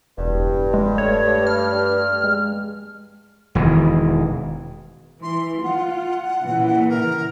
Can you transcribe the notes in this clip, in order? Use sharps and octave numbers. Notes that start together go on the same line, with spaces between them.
E1 G2
G#3
A3 C#5
F6
G#3
E1 D#3 E3
E3 C6
F4 F#5
A#2 C#3 E3
A#4